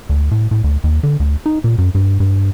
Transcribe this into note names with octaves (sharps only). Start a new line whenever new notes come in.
D2
A2
A2
D2
D#2
D3
D2
D#4
A#2
F#2
G2
G2